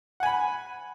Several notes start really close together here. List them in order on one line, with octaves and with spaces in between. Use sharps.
F#5 G#5 B5